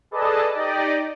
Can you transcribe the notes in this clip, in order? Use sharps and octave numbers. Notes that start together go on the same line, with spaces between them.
G#4 A4 B4 D5 D#5 A5
D#4 G4 D5 D#5